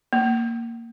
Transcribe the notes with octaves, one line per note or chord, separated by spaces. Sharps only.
A#3